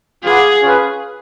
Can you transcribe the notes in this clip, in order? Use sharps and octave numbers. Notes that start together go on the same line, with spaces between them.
F4 G#4 B4 D5 F#5
C#4 F4 G#4 B4